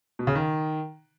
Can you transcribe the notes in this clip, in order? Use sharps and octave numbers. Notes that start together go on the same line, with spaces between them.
B2
C#3
D#3